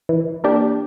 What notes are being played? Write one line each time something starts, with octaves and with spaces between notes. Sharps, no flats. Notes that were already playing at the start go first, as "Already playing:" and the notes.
E3
A#3 D4 G4